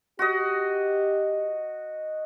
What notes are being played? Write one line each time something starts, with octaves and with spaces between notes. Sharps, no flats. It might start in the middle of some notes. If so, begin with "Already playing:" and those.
F#4 G4 D#5